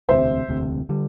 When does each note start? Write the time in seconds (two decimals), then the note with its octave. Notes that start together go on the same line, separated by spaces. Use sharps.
0.09 E1 D2 C3 C5 E5
0.48 E1 D2 C3
0.89 D3 G3